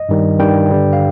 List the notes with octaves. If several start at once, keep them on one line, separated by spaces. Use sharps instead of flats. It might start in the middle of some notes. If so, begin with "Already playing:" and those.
Already playing: D#5
G2 D#3 G3
G2 D#3 G3 G5
G2 D3 G3
F5